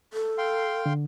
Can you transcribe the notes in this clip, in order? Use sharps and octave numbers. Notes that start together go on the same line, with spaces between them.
A4
F5 G5 C6
D3